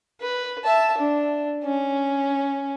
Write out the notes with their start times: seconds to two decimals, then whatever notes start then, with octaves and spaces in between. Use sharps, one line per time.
0.21 B4
0.64 E5 A5
0.98 D4
1.64 C#4